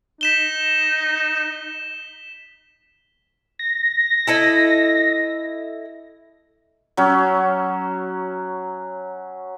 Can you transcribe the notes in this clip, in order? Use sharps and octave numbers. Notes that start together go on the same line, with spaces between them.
D#4 B6 E7 G7
A#6
E4 A4 D#5
F#3 C#4